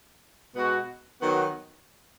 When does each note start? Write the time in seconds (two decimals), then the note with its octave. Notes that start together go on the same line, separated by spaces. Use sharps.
0.55 B2 G#3 B3 F#4
1.21 D#3 F#3 B3 F#4